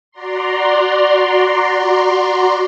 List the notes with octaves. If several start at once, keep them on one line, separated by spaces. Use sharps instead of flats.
F#4 D5 A#5 C6